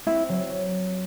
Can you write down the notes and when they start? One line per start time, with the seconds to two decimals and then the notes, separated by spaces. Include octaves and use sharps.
0.06 C4 E4
0.29 F#3